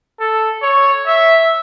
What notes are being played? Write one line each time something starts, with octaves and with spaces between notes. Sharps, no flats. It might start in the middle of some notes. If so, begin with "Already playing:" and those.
A4
C#5
E5